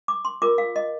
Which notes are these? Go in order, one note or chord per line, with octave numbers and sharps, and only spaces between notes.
D6
C6
F4 A#4 D6
F5
D#5